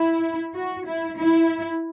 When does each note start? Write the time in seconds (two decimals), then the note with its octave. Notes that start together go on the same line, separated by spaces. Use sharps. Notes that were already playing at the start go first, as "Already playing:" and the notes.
Already playing: E4
0.55 F#4
0.87 E4
1.18 E4